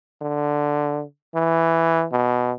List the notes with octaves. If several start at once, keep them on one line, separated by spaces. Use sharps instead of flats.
D3
E3
B2